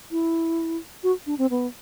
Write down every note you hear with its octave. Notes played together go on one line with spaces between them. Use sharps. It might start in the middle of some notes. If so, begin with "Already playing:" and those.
E4
F#4
D4
C4
B3